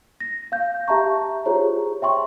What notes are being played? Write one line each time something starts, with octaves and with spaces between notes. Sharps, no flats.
A#6
F5 G6
G4 E5 A5 A#5 C#6
F4 G4 G#4 C5 C#5 A#5
C#5 E5 G5 C6 C#6